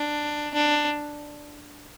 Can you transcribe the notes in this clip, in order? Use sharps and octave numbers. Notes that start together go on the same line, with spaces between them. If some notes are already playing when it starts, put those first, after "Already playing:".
Already playing: D4
D4